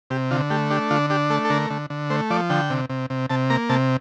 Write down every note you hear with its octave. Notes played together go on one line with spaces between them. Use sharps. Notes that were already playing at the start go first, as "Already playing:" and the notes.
C3 G4
D3 F4
A3 G4
D4 G4
D3 F4
D4 G4
A3 A4
A4
D3 A#4
D3
D3
A3 C5
F3 D5
D3 G5
C3
C3
C3
C3 A5
A#3 A#5
C3 A5